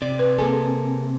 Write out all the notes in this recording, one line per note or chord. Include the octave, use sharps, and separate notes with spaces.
C3 D5
B4
A#3 G#4 A4 G#5